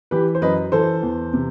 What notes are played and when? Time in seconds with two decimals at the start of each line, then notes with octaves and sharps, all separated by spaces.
0.11 E3 G4 B4
0.35 C5
0.42 F#2 B4 D#5
0.72 E3 A4 C5
1.03 E2
1.34 C3